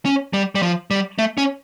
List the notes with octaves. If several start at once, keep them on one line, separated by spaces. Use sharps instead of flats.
C#4
G3
G3
F3
G3
A3
C#4